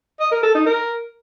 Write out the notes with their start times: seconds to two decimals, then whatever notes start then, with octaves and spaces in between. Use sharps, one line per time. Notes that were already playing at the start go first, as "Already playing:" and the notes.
0.20 D#5
0.32 A#4
0.43 A4
0.55 D#4
0.66 A#4